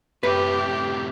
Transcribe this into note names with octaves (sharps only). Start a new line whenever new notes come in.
F#2 A2 C3 G4 B4